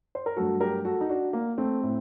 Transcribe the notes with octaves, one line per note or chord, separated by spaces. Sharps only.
C5
A#4
G2 F#3 A3 F#4 A4
G4 A#4
F#4 A4
D#4
D4 F#4
A#3
A3 C4
A2 A3